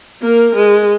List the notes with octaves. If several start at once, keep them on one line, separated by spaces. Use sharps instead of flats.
A#3 A#4
G#3